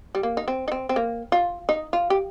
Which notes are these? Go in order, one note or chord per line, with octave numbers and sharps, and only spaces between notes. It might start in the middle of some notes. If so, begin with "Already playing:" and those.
G3
A#3
D#4
C4
D#4
C4
C4
A#3
F4
D#4
F4
G4